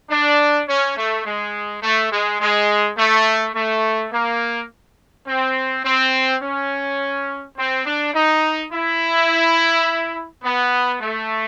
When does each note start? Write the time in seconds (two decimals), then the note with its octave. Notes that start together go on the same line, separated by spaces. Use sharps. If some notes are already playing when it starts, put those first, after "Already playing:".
0.10 D4
0.68 C#4
0.97 A3
1.25 G#3
1.83 A3
2.12 G#3
2.40 G#3
2.97 A3
3.55 A3
4.12 A#3
5.28 C4
5.85 C4
6.41 C#4
7.57 C4
7.86 D4
8.14 D#4
8.72 E4
10.44 B3
11.01 A3